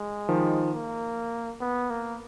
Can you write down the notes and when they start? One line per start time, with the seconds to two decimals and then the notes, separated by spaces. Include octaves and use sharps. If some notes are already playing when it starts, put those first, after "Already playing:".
Already playing: G#3
0.29 D#3 F3
0.73 A#3
1.61 B3
1.90 A#3